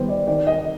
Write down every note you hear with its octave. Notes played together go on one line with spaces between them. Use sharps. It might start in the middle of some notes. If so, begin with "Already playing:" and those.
Already playing: D#3 G3 B3 C5
D5
D#3 D5
D#5